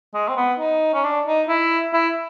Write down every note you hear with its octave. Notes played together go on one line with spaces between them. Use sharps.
G#3
C4
B3
D#4
C#4
D4
D#4
E4
E4